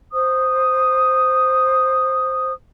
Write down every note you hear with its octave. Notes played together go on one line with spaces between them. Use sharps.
C5 D#6